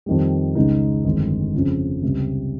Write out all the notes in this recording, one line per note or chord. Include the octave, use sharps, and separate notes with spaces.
F2 D#3 G3
C#2 C#3 G#3 D#4
G1 F2 D#3 G#3
F2 C#3 F3
C#2 C3 G3